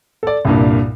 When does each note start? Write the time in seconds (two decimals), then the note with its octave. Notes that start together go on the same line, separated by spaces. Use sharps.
0.23 A4 D5
0.45 C2 G2 A#2